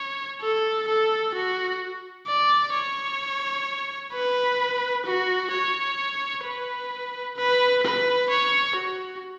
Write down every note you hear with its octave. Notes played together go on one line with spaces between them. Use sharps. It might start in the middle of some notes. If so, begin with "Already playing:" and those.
Already playing: C#5
A4
A4
F#4
D5
C#5
B4
F#4
C#5
B4
B4
B4
C#5
F#4